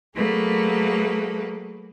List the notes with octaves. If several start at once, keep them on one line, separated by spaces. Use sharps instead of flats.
F#3 A3 A#3 G#4 A4 B4